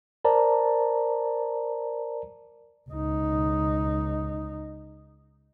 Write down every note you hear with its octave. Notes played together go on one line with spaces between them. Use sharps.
A#4 C5 D5 A5 A#5
C#2 D#4